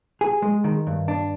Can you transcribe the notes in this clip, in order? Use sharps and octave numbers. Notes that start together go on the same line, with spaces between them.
G#4
G#3
D#3
G2
D4